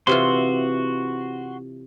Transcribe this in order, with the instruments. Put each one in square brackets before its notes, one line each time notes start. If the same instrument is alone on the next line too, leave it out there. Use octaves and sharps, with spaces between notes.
[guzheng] C3 E3 F4 [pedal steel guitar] F#4 C6